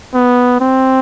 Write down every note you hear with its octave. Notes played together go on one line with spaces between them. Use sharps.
B3
C4